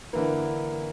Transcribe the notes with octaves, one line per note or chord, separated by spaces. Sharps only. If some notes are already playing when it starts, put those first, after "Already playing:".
D3 E3 A#3